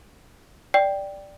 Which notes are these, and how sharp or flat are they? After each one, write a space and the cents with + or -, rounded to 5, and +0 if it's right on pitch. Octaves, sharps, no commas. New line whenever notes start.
D5 +0 G5 +0